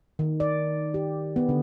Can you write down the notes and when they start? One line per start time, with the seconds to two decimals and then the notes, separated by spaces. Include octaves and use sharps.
0.19 D#3
0.40 D5
0.94 G4
1.36 B3
1.49 D3